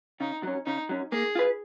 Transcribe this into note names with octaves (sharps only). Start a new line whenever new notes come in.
C#3 D#4
F#3 C#4
C#3 D#4
F#3 C#4
A#3 G#4
F4 B4